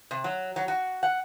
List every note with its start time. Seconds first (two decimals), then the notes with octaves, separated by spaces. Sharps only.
0.11 C3
0.24 F#3
0.56 F#3
0.68 F#4
1.03 F#5